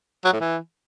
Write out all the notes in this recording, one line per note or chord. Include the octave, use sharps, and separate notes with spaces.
F#3
A2
E3